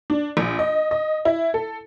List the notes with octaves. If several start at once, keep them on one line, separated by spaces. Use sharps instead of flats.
D4
A#1
D#5
D#5
E4
A4